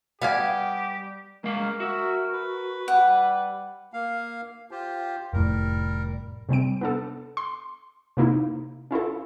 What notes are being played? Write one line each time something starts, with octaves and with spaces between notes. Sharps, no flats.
G3 B3 G4 F5 G#5
G#3 A#3 A#4 F5
F#4 E5
B4
G3 F#5
A#3 F5
F4 G4 C5
F1 A2 G3 A#4
C3 G3 C4 D7
B3 D4 A4
C6
C3 A#3 D#4 E4
C#4 E4 F4 A4